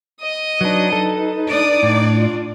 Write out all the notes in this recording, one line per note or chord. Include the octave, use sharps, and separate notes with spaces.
D#5 D#6
F#3 D4 D#4 B4
A4
D4 D5 D#6
A2 D4 D#4 D6
F4